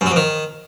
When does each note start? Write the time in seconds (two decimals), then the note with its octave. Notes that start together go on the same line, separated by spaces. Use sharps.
0.01 F#2
0.06 F#3
0.11 F2
0.16 D#3